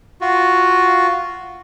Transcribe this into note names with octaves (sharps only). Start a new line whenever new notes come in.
F4 F#4